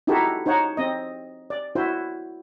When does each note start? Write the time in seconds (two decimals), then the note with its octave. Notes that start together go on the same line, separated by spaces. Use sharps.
0.07 D#4 E4 F#4 G4 A4 A#4
0.46 D#4 C5 C#5 F#5
0.77 C4 D#5
1.50 D5
1.75 E4 F#4 C5